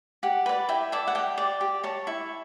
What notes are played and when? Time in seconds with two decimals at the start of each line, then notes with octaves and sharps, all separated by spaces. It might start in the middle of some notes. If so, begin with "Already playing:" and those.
0.23 G4 F#5
0.46 B4 D5
0.69 E4 G5
0.92 A4 D5
1.07 F#5
1.15 G4 G5
1.38 D5
1.61 G4
1.84 C#5 A5
2.07 E4 C#6